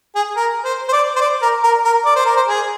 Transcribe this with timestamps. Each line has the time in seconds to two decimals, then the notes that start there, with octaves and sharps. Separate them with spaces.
0.15 G#4
0.36 A#4
0.64 C5
0.88 C5
0.92 D5
1.16 C5
1.21 D5
1.42 A#4
1.64 A#4
1.84 A#4
2.05 D5
2.15 C5
2.26 A#4
2.36 C5
2.48 G#4